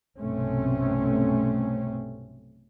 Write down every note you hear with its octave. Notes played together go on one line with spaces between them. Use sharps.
B1 G2 C3 A3 C4 C#4